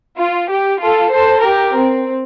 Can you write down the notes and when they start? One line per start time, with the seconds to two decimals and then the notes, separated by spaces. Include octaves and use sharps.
0.18 F4
0.50 G4
0.81 F4 A4
1.12 A4 C5
1.43 G4 A#4
1.76 C4